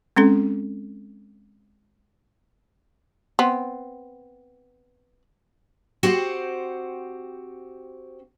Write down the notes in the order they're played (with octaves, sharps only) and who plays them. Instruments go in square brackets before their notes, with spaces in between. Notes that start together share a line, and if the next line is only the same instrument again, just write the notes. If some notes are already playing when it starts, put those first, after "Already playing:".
[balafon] G#3 C4 C#4 A4
[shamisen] B3 C4
[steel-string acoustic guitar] C4 F#4 G4 C5 F#5